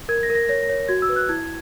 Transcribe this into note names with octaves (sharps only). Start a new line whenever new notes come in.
A#4 G#6
A#6
A#4
A#6
C#5 A#6
A#6
C#5
F#4 G#6
E6
B4
F#6
E4 G#6